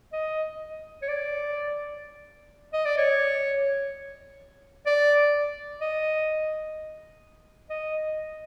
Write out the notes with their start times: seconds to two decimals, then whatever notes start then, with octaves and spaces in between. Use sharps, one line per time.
0.13 D#5
1.02 C#5
1.09 D5
2.73 D#5
2.86 D5
2.98 C#5
4.86 D5
5.81 D#5
7.70 D#5